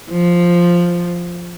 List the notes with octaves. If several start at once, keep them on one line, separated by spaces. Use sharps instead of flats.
F3